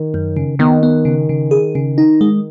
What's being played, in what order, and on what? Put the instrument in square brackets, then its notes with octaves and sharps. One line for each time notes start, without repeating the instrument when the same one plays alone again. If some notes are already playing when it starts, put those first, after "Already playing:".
Already playing: [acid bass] D#3
[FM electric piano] F#2
C#3
[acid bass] D#3 [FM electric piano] B3
[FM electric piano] B3
C#3
C#3
G#4
C#3
D#4
G#3